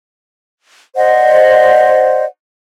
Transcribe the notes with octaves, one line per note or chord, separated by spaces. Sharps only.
C5 D5 D#5 F#5